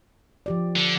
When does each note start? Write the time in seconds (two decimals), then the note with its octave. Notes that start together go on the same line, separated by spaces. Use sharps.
0.46 F3 G4 D5
0.76 D3